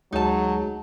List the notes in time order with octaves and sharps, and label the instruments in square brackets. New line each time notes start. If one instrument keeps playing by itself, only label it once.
[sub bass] D2 [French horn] F#3 [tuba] G#3 [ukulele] D#4 A5